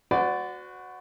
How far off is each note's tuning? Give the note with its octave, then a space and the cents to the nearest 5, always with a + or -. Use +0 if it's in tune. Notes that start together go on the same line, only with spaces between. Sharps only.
F#4 -10 B4 +45 D5 -10